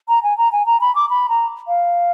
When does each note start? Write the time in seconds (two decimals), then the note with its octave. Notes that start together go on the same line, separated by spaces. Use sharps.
0.09 A#5
0.23 G#5
0.38 A#5
0.52 G#5
0.66 A#5
0.81 B5
0.95 D6
1.10 B5
1.29 A#5
1.68 F5